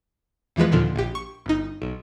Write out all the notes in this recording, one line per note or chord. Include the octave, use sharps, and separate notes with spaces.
E2 E3 F3 G#3 B4
D#2 A#2 D3 F3
A#1 G4
C#6
G1 D#4
B1